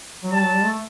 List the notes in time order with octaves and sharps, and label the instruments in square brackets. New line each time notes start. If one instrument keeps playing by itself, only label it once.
[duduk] F#3
[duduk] G3 [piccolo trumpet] A5
[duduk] F#3
G3
A3